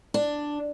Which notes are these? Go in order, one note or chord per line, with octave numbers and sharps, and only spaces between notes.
D4